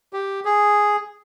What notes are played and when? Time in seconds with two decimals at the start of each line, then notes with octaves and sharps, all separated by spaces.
0.13 G4
0.45 G#4